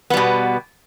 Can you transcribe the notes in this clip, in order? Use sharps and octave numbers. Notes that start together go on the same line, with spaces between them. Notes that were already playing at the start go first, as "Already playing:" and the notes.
B2 G3 B3